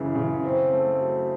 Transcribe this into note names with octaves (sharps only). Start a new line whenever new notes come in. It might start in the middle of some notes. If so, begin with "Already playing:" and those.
Already playing: F#2 C#3 E3
C#3
C4
A3
F#3